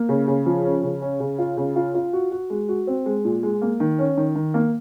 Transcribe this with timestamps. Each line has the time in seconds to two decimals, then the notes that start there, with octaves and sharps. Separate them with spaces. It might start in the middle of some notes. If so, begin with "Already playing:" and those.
Already playing: A#3
0.09 C#3
0.28 C#3
0.46 F3
0.65 C#4
0.83 C#3
1.02 C#4
1.20 C#3
1.39 F4
1.57 C#3
1.76 F4
1.95 F4
2.13 F#4
2.32 F#4
2.50 G#3
2.69 F#4
2.87 C4
3.06 G#3
3.25 A#2
3.43 G#3
3.62 A#3
3.80 D#3
3.99 C#4
4.17 D#3
4.35 D#3
4.54 A#3